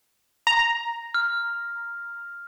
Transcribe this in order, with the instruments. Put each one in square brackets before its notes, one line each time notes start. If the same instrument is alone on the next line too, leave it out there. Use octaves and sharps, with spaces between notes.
[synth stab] A#5
[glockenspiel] F6